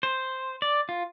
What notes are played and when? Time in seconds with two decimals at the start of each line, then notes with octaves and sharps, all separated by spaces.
0.03 C5
0.62 D5
0.89 F4